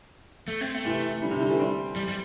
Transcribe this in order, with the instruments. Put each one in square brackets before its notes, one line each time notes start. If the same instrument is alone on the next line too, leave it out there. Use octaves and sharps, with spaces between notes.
[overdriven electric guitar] A3
C4
A3
[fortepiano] C3 E3
D3 G3
C3
D3 G3
E3 A3
G3 C4
[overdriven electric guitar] G3
G3